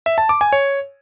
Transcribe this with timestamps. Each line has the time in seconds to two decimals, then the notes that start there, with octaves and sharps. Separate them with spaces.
0.06 E5
0.18 A5
0.29 D6
0.41 G#5
0.53 C#5